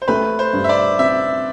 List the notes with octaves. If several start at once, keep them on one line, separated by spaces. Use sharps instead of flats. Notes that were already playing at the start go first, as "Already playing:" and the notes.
C5
A3 B4
C5
G2
E5
D5
C4 E5